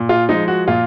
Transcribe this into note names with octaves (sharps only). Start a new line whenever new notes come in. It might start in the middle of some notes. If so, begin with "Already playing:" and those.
Already playing: A#2
F4
F3 G#3 D#4
F#4
A#2 F4